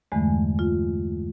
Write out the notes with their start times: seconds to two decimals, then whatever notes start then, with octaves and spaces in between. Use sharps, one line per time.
0.12 E2 G2 D3 E3 G#3 A3
0.59 F4